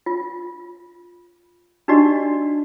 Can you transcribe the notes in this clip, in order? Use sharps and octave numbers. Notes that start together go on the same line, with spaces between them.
F4
D4 D#4 F#4 G4 D5 D#5